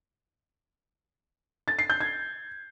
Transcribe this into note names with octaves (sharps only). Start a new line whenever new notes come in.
A6
C7
G6
G#6